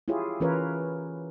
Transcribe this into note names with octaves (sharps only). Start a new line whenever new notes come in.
E4 F4 G4 G#4 C#5
E3 C#4 F4 A#4 B4 C#5